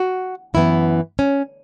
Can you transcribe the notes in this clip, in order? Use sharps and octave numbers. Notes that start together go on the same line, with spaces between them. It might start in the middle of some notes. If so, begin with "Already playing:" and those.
Already playing: F#4
F#2 E3 B3 E4
C#4